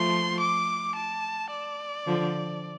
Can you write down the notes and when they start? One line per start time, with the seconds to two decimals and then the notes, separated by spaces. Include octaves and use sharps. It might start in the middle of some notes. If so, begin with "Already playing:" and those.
Already playing: F3 A3 C6
0.40 D6
0.96 A5
1.51 D5
2.06 D3 F3